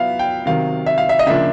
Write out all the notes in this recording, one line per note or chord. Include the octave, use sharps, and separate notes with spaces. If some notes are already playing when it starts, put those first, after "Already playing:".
Already playing: F#3 B3 E4 E5 F5
G5
C3 D#3 F#3 F5
E5
F5
E5
D#5
C#3 F3 A#3 D4 F4 E5